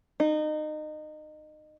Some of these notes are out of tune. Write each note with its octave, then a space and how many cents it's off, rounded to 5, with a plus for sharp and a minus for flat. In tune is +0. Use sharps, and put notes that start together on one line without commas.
D#4 -25